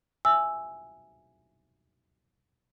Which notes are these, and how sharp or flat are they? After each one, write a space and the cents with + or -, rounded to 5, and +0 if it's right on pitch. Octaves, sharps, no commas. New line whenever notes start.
E5 +0 G#5 +0 E6 +0